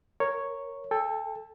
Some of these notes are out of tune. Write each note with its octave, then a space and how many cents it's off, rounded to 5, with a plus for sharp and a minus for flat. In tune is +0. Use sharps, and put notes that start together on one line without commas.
A#4 +0 C#5 +0
A4 +0 G5 +40